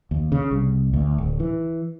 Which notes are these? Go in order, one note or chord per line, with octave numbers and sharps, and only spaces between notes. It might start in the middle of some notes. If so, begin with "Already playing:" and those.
D#2
C#3
C2
D2
D1
E3